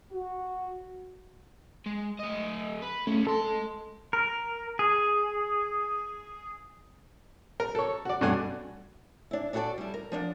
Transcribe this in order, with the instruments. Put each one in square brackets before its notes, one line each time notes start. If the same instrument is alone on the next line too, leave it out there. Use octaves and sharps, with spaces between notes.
[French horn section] F#4
[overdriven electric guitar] G#3
A3 D#5
B4
[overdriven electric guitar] D2 C#4 [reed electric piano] A3
[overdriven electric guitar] G#3 C6 [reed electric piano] A4
[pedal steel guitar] A#4
G#4
[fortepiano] A#4
A4 C#5
F#4 D5
G2 B2 A3 D4 F#5 G#5
[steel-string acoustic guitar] D4 E4
D4 E4 F#4 G#4 A4 D5
G3 E4
A#4
F3 D4 F5 F#5